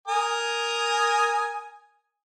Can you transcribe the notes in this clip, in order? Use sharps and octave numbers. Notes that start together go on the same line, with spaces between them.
A#4 G#5 D#6